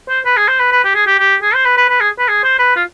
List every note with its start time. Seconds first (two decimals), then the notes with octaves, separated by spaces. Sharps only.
0.09 C5
0.25 B4
0.37 G#4
0.48 C5
0.60 B4
0.72 B4
0.84 G4
0.95 G#4
1.07 G4
1.19 G4
1.42 G#4
1.54 C5
1.65 B4
1.77 B4
1.89 B4
2.00 G#4
2.18 B4
2.28 G#4
2.44 C5
2.59 B4
2.76 F4